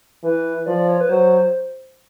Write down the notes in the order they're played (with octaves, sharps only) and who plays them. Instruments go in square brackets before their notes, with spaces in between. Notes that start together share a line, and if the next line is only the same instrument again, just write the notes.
[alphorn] E3 [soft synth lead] B4
[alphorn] F3 [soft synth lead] D5
[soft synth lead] C#5
B4
[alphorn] F#3 [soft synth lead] C5